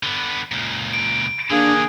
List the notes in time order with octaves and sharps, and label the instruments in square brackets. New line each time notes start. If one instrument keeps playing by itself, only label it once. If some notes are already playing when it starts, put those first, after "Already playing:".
[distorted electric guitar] D3 B3
C#2 A#2
[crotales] D7
[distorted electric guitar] D3 D#3 [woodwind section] A#3 G#4 [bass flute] D4